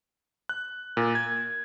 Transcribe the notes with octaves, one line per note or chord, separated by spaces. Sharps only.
F#6
A#2
G#6